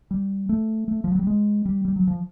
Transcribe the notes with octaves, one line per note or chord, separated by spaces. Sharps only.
G3
A3
A3
F3
F#3
G3
G#3
G3
G3
F#3
F3